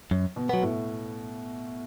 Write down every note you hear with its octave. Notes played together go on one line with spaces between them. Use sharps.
F#2
B2
F#3 B3
A2